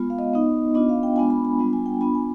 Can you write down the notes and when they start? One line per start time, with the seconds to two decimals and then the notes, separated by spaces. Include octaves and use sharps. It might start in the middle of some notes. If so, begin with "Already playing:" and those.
Already playing: G#3 B3 F4
0.10 F5
0.19 D#5
0.34 B3 D#4
0.74 B3 D4 F4 D#5
0.89 F5
1.03 G5
1.16 G#3 B3 D4 F4 G#5
1.30 B5
1.45 B5
1.59 G3 B3 D4 F4
1.73 G#5
1.86 G5
2.01 B3 D4 F4 B5
2.15 G#5